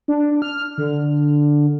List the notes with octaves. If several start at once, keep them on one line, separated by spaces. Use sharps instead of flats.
D4
F6
D3